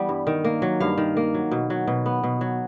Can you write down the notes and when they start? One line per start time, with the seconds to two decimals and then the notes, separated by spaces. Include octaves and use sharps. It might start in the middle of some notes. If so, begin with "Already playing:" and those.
Already playing: E3 G3 B3
0.09 G2
0.27 D#3
0.45 A#3
0.62 F#3
0.80 G2 F5
0.98 D#3
1.17 A#3
1.34 F#3
1.51 B2
1.70 F#3
1.88 B2
2.06 B3
2.24 B2
2.41 F#3